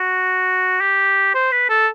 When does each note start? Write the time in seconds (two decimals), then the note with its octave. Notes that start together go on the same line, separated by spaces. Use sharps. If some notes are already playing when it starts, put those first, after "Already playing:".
Already playing: F#4
0.81 G4
1.34 C5
1.52 B4
1.69 A4